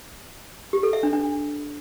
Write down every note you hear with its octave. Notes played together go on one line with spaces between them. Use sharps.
G4
A4
E5
D4
D4